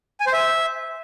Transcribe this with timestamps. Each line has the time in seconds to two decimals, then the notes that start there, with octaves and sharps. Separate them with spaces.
0.20 G#5
0.27 C5
0.33 E5